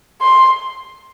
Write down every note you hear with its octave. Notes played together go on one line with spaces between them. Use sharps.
C6